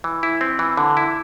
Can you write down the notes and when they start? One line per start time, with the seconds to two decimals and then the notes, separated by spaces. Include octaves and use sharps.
0.04 E3
0.23 E4
0.41 C4
0.59 E3
0.77 D3
0.97 E4